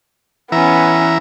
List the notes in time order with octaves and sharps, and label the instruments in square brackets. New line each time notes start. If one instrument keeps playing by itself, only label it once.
[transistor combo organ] E3 E5 A#5 [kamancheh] B3 C#4